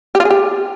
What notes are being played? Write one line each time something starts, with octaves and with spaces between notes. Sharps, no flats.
G4
F4
G#4
G4